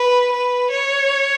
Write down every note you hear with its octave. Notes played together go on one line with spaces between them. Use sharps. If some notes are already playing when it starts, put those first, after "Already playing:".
Already playing: B4
B4
C#5